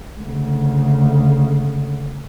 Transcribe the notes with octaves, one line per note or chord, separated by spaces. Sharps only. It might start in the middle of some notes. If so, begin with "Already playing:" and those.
D2 C#3